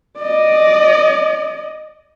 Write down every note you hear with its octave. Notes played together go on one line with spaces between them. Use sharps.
D5 D#5